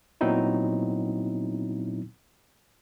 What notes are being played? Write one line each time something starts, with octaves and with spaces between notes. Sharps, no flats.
A#2 F#3 B3 C4 D#4 E4